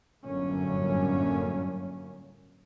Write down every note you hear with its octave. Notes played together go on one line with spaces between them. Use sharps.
G1 F#2 A2 D3 A#3 C#4